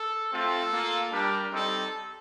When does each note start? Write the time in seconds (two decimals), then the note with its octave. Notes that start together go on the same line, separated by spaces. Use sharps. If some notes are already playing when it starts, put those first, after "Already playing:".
Already playing: A4
0.31 A3 C4 F4 A4
0.71 A#3 F4
1.12 G3 D4 G4 A#4
1.52 G3 C4 D#4 A4